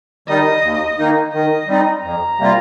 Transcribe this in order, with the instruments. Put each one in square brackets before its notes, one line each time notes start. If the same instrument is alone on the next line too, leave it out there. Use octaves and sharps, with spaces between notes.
[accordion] D#3 G3 D#4 [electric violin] D#5
[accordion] D#2
D#3 A#3 D#4
[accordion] D#3 [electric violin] D#5
[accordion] G3 C4 D#4
[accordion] F2 [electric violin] A#5
[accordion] C3 G3 A#3 F4